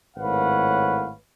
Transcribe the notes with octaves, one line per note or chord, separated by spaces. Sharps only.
G#1 A2 B4 C#5 F5 F#5